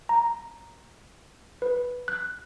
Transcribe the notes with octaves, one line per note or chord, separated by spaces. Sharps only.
A#5
B4
F#6